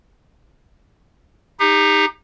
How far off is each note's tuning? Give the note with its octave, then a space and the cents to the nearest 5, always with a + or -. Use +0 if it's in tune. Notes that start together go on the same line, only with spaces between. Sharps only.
D#4 +0 G4 +35